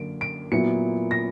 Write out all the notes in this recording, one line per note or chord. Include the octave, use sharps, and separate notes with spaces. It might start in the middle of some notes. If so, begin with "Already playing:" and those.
Already playing: F#2 D3 A#3 D7
D7
A#2 F#3 B3 E4 C#7
A#6